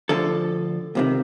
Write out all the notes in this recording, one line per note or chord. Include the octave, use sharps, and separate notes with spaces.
D2 D3 F3 A4
C#2 C3 D#3